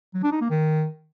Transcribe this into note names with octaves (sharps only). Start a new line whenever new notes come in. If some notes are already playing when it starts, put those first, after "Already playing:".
F#3
D4
D#4
A#3
D#3